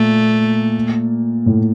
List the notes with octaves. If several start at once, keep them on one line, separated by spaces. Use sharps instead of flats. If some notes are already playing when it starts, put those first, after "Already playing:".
Already playing: A#2 A3
A2